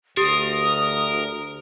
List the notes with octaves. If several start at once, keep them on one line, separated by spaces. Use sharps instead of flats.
D2 G4 A#4 D#6